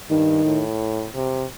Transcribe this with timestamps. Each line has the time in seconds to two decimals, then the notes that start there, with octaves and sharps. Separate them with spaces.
0.10 G2 D#3
0.45 A2
1.15 C3